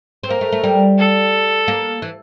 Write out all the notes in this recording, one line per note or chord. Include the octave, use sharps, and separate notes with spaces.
C4
A#3 A#4
A3
A3
G3
A4
A#3
E3